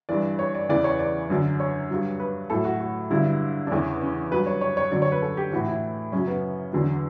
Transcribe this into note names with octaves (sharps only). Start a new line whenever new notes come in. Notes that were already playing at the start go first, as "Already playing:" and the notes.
G2 E3 D5
C#5
D5
E2 C#3 E3 D5
C#5
D5
F#2 D3 F#3
C#5
G2 F#3
B4
A2 F#3 A4
F#4
F#4
G2 D3 F#3 E4
D4
E2 C#3 E3 C#4
C#4
G2 F#3 B4
C#5
C#5
C#5
F#2 D3 F#3 D5
C#5
B4
A4
G4
A2 E3 F#4
E4
F#2 C#3 F#3 C#4
B3
E2 D3 F#3